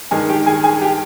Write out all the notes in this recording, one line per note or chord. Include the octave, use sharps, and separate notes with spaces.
G2 D#3 G#3 G#4 G#5
G4 G5
G#4 G#5
G#4 G#5
G4 G5